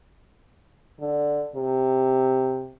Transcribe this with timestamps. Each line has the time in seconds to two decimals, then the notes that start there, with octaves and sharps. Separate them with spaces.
1.00 D3
1.56 C3